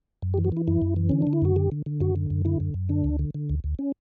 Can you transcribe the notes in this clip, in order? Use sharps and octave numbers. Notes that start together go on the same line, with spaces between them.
F#2
G4
E3
F#4
E3 E4
F#2 E4
F#2
E3
D3 C#4
D3 D4
E4
F#2 F#4
D3 G4
D3
D3
F#2 F#4
D3
F#2
D3 E4
F#2
F#2
D3 D4
D2
D3
D3
D2
D2
C#4